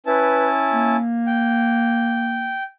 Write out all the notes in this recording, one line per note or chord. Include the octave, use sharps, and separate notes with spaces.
C#4 E4 B4 A5
A#3
G5